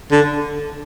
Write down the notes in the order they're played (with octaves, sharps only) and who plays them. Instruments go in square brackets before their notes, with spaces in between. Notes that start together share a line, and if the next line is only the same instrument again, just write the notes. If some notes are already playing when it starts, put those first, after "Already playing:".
[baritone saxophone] D3